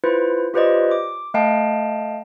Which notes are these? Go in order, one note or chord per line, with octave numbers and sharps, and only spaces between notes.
E4 F4 B4 C5
F4 G4 B4 C5 D5 D#5
D6
A3 D#5 F5 G5 A5